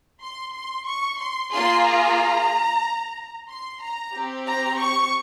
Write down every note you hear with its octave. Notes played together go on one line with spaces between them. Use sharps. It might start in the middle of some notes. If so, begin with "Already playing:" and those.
C6
C6
C#6
C6
A#3 F4 G#4 C6
A#5
C6
A#5
C4 G4
A#5
C#6